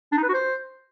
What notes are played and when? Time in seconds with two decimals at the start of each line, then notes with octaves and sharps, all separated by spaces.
0.12 D4
0.18 D#4
0.23 B4
0.29 F#4
0.34 C5